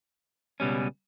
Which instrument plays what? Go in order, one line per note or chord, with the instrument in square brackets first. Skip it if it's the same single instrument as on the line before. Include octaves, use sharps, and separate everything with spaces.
[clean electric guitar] C#2 B2 G3 C#4